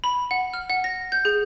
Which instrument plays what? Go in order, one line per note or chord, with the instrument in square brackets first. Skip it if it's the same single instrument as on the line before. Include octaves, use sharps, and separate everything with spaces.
[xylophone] B5
F#5
F6
F#5
A#6
G6
G#4